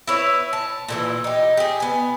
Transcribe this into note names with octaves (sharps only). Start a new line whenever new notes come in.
E4 B4 C#5
A5
A#2 D3 E3
D#4 G4
G4 G#4
B3 G#5